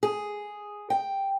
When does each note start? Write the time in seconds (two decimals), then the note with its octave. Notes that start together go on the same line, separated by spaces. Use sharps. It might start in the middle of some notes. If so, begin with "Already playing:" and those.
0.03 G#4
0.90 G5